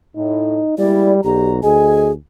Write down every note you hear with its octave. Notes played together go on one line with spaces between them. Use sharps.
A2 D#4
G3 G#3 A#3 E4 D5
B1 F#4 G4 D5 A#5
D2 G#4 D#5 G#5